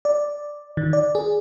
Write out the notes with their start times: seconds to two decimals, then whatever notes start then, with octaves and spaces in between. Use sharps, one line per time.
0.05 D5
0.77 D#3
0.93 D5
1.15 G#4